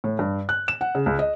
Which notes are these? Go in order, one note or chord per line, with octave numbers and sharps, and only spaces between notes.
A2
G2
F#6
E7
F#5
C#3
C#2
D#5